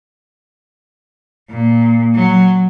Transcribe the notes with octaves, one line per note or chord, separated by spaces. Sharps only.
A#2
F#3